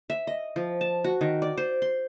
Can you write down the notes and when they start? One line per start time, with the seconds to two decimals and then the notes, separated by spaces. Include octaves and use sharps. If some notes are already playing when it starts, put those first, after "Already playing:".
0.10 E5
0.27 D#5
0.56 F3
0.81 A5
1.04 F#4
1.21 D#3
1.42 D5
1.58 C5
1.82 C6